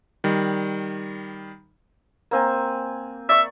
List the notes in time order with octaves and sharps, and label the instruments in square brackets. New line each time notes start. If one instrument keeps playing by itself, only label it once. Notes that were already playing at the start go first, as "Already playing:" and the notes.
[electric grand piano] D#3 G3
[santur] A#3 C4 G#5
[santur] D5 C#6 [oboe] E5